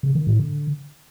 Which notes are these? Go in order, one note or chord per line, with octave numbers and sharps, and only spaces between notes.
C#3
D#3
A2
D3